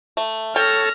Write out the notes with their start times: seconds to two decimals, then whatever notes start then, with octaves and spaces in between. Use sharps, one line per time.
0.17 A3
0.56 A4 C#5 G5 A5 F6 A#6